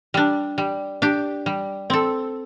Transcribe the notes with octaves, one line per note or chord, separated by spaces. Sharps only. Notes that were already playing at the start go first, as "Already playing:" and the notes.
G3 D4
G3
D4 G4
G3
C4 A4